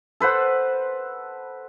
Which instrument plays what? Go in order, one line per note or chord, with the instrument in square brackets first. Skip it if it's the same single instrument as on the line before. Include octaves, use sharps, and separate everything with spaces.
[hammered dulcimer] A4 B4 C5 F#5